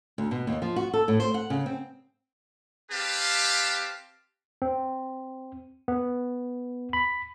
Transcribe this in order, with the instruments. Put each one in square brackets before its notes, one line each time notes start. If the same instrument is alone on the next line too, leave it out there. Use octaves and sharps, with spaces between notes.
[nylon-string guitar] D2
B2
D#2
F3
F#4
A4
A2
C5
F#5
C#3
C4
[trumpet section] C4 G4 B4 F5 A5
[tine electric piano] C4
B3
B5